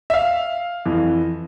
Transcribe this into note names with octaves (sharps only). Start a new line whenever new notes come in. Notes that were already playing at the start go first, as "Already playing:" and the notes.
E5
F5
F2 E3